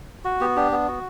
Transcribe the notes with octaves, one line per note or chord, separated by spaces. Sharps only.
F#4
B3 G4
D4 G4
B3
F#4